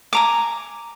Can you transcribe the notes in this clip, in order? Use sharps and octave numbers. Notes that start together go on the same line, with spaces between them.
G#5 A#5 D6